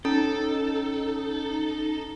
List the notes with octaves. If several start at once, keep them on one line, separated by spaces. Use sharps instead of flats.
C#4 D#4 A4